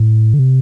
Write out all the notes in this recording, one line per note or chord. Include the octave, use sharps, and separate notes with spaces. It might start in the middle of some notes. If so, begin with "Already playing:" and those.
Already playing: A2
D3
C3